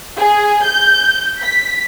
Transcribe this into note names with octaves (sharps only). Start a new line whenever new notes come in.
G#4
G6
B6